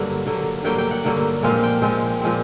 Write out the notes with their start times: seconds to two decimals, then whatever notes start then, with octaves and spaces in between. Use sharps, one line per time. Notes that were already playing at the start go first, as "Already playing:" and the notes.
Already playing: G2 D3 F#3 A#3 F#5
0.26 G2 D3 F#3 A#3
0.64 G2 D3 F#3 A#3 G5
0.78 G5
0.91 F#5
1.05 G2 D3 F#3 A#3
1.43 A#2 F3 G#3 C4 F5
1.63 G5
1.82 A#2 F3 G#3 C4
2.21 A#2 F3 G#3 C4